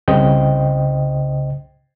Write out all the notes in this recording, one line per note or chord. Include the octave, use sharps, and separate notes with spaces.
C2 C#3 C5 D#5 G5